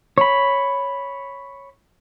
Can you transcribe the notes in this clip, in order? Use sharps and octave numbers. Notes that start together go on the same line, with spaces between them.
C#5 B5